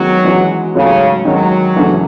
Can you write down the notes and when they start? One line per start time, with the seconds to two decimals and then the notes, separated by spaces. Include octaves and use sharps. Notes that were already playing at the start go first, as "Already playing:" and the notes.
Already playing: E2 D#3 F#3 G#3 C#4
0.25 E3 G#3 C#4 F#4
0.75 G#2 C#3 F#3 A3 C#4
1.25 D#3 F#3 G#3 C#4
1.76 F#2 C#3 E3 A3